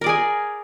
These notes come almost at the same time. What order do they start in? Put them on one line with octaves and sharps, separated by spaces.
A#4 D5 G#4 G#5